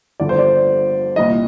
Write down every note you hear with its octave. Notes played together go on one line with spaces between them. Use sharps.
G1 G2 D3 F3 D5
C5
D5
C2 A#2 F3 D#5